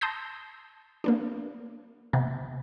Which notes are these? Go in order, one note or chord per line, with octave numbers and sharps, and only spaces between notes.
A5 C6 D#6 E6 G6 A#6
A#3 B3 D4
C3 A#3 B3